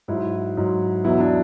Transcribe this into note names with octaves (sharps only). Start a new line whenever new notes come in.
G#2 F#3 E4
G#2 F#3
E2 B2 F#3 E4
D4